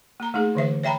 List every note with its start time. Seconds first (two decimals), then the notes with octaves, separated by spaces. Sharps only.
0.20 A#3 A#5
0.34 A3 D#4 G#4
0.55 D3 E3 E5
0.83 C#5 E5 G5 A#5 B5